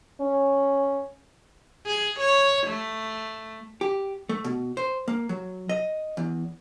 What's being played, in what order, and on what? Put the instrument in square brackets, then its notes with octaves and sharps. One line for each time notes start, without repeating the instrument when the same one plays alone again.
[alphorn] C#4
[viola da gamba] G#4
C#5
A3
[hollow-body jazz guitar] G4
A3
B2
C5
A#3
F#3
D#5
E2